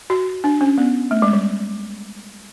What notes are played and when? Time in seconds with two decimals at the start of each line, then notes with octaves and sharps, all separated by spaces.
0.10 F#4
0.44 D4
0.61 C#4
0.78 B3
1.11 A3
1.22 G#3
1.33 G3